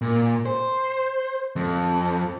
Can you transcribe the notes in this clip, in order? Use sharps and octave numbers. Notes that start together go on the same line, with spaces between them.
A#2
C5
F2